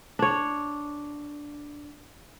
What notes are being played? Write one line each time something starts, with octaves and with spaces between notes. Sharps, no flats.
D4 C#5